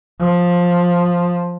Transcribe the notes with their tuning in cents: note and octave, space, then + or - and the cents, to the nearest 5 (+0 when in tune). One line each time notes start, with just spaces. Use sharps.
F3 +10